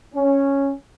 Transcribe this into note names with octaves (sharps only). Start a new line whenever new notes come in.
C#4